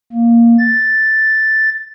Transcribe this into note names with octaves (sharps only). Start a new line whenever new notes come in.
A#3
A6